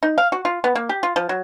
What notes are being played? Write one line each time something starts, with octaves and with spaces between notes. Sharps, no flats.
D#4
F5
F#4
F4
B3
A#3
G4
F4
F3
F#3